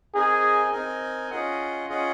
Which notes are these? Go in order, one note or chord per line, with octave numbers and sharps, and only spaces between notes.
C4 D#4 G#4 A#4 D#5 G#5
C4 D#4 A#4 D#5 G#5
C#4 F4 G#4 D#5 F#5
C#4 F4 G#4 D#5 F#5